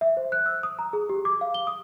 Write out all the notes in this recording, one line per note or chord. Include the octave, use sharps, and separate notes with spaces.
E5
C5
F#6
E6
D#6
A#5
G#4
G4
D6
F5
G7
D#6